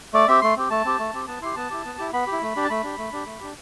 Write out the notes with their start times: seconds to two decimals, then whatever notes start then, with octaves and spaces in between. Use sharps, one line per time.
0.14 A3 D5
0.28 C4 G4 E5
0.42 A3 C6
0.57 C4 G4
0.70 A3 A5
0.85 C4 G4
0.99 A3
1.14 C4 G4
1.27 B3 A5
1.42 E4 G4 C6
1.56 B3 A5
1.70 E4 G4
1.85 B3
1.98 E4 G4
2.13 B3 B5
2.27 G4
2.32 E4
2.42 A3
2.56 D4 G4
2.64 A5
2.70 A3 B5
2.84 D4 G4
2.98 A3
3.13 D4 G4
3.27 A3
3.40 D4 G4